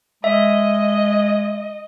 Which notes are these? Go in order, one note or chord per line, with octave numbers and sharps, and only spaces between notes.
G#3 D#5 E5